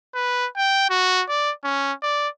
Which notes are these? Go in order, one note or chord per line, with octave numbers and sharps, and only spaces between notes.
B4
G5
F#4
D5
C#4
D5